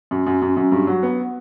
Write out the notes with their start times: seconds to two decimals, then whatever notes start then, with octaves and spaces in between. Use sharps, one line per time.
0.11 F#2
0.27 F#2
0.42 F#2
0.57 F#2
0.72 G2
0.87 F#3
1.03 B3